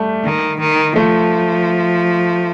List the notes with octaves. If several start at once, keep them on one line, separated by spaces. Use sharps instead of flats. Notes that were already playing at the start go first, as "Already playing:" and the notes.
Already playing: G3 A3
D#3
D#3
F3 A3